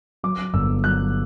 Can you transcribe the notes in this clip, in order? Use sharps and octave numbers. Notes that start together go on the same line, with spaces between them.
F#3 D6
G1 E6
F#3 F#6